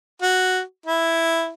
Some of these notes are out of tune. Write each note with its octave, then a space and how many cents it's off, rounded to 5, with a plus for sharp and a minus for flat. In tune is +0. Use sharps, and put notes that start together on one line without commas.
F#4 +0
E4 +0